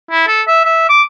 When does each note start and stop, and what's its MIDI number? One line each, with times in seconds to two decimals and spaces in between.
0.11 0.26 64
0.28 0.42 69
0.48 0.63 76
0.65 0.86 76
0.90 1.02 86